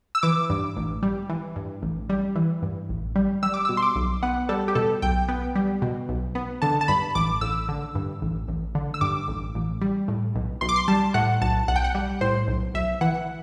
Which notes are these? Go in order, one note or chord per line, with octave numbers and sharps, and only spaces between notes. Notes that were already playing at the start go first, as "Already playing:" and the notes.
E6
E3 D6
G2
A1
G3
E3
G2
A1
G3
E3
G2
A1
G3
G3 E6
D6
B2 E6
C6
D6
B1
B3 F#5
G3 A4
G4
B2 A4
B1 G5
B3
G3
B2
B1
B3
D3 A5
A5
G2 B5
A1 D6
A1 E6
D3
G2
A1
A1
D3
E6
G2 D6
A1
A1
G3
A2
B1
B1 C6
D6
C6
G3 A5
A2 F#5
B1 A5
B1 F#5
G5
F#5
G3
A2 C5
B1
B1 E5
E3 F#5